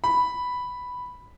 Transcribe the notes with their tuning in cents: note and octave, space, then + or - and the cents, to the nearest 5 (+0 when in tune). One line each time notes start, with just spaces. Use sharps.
B5 +0